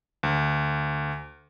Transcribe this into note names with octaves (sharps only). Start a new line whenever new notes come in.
D2